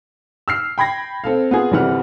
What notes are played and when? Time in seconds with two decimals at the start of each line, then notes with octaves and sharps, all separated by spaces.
0.48 E6 F6 C7
0.78 G5 B5 G#6 A#6
1.24 C4 A4 F5
1.51 B3 F4 G#4
1.72 G1 C3 E3 G3 F#5 F6